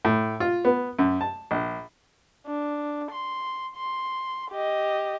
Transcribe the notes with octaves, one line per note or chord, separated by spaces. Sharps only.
A2
F4
B3
F#2
A5
A#1
D4
C6
C6
G4 D#5